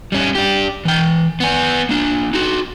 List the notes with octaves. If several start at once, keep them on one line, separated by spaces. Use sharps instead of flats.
G3 C#4
D4 G4
E3 G5
B3 G#5
A#3 D4
D#4 F#4